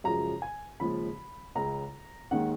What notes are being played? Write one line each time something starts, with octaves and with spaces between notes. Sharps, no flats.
F#2 C#3 F3 G#3 A#5
G#5
D#2 C#3 F3 G#3 B5
C#2 C#3 G#3 A#5
D#2 D#3 G#3 F#5